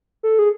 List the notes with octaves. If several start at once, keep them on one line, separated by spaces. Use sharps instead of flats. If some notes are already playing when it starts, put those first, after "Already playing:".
A4
G#4